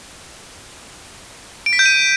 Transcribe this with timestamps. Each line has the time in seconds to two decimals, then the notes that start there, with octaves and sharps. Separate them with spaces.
1.66 D7
1.73 B6
1.79 G6
1.86 D#7